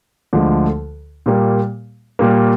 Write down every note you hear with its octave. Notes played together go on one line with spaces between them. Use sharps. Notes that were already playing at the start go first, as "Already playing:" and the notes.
D2 D3 F3 G#3
A#2 G3 A#3
A#2 G3 A#3